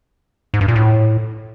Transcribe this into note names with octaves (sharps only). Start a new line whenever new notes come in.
G#2
G2
A#2
A2